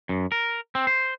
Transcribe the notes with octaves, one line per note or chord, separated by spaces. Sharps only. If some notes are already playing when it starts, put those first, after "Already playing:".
F#2
A#4
C4
C5